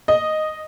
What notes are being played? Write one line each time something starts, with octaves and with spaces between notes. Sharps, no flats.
D#5